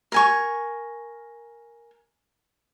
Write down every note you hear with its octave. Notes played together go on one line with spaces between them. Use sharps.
A#4 G#5 C#6